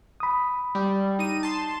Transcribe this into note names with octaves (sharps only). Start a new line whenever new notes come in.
B5 D#6
G3
D#4 D#7
A5 C6